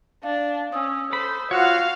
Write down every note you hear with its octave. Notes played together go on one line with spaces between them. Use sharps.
D4 F5
C#4 D#6 E6
A4 C5 B5
F4 F#4 C#5 F5 F#5